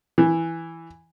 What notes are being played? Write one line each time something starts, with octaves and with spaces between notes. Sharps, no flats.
E3